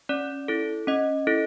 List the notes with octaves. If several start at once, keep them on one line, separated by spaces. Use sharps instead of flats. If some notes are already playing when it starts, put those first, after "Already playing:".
C#4 D5
E4 A4
C#4 D#5
E4 A4